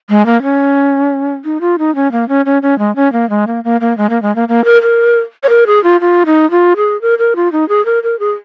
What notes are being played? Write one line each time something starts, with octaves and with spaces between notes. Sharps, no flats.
G#3
A#3
C#4
D#4
F4
D#4
C#4
A#3
C#4
C#4
C#4
G#3
C#4
A#3
G#3
A#3
A#3
A#3
G#3
A#3
G#3
A#3
A#3
A#4
A#4
C#5
A#4
G#4
F4
F4
D#4
F4
G#4
A#4
A#4
F4
D#4
G#4
A#4
A#4
G#4